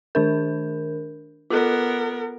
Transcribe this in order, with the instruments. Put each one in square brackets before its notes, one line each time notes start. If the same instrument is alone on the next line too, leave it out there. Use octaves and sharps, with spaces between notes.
[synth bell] D#3 D4 A#4
[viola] B3 A#4 [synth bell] F4 A4